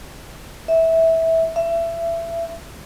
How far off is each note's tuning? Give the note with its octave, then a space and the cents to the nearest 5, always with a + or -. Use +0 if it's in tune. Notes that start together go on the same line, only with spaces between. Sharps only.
E5 -15
E5 +25